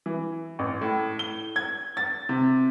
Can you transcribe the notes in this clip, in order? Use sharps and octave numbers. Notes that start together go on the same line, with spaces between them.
E3
A1
A2
G7
G#6
A6
C3